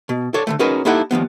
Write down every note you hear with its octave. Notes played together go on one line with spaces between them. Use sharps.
B2
A4 C#5 D5
D3 D#3 A3
C#4 D#4 F#4 G#4 A#4 B4
A#3 D#4 E4 G4 A4 F#5
D#2 E3 F3 B3